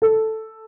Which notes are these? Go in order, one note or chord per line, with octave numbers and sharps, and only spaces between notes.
A4